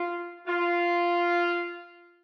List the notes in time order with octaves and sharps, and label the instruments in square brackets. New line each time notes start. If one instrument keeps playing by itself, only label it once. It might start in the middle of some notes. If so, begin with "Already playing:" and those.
Already playing: [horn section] F4
F4